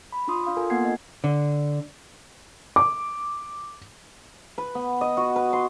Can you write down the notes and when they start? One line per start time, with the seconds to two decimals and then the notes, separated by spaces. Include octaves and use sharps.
0.12 B5
0.28 D4 F4 C6 D#6
0.44 D4 F5 C6 D#6
0.57 F4 A4 A#4 G#5
0.70 A#3 B3 F#5 G#5 G#6 C7
0.83 B3 D#5
1.24 D3
2.76 D6
4.58 B4
4.75 B3
5.01 D#5
5.17 F#4
5.36 B4
5.53 C6